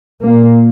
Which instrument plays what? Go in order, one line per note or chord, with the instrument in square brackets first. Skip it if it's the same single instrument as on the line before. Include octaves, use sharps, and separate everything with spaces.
[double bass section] A#2 A#3